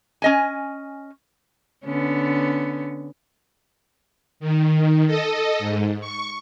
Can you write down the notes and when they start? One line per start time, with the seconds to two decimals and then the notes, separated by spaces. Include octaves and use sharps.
0.22 C#4 D#5 G#5
1.85 D3 B3 C#4
4.40 D#3
5.07 A4 D#5
5.59 G#2
6.01 C#6